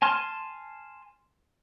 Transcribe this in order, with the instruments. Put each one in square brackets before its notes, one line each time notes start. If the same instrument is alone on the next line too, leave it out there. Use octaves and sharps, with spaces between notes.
[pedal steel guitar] G#5 A5 C6 F6